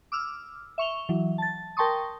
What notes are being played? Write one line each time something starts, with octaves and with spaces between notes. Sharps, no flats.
D6 E6 F6
E5 C#6 F7 G7
E3 F#3
A5 A6
A#4 G5 A5 C6 C#6 D#6